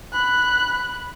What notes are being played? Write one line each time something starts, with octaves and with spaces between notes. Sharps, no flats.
B5 F#6